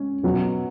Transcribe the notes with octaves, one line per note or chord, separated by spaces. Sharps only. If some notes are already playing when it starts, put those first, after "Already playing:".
Already playing: G#3 C#4
B2 F#3 B3